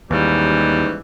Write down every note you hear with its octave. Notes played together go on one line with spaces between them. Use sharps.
D#2 G#2 E3 G3 C#4